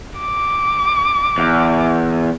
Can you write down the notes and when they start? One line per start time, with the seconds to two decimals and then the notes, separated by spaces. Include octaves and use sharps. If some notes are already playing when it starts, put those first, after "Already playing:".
0.20 D6
1.38 E2